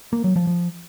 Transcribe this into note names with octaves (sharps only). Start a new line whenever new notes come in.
A#3
F#3
F3
F3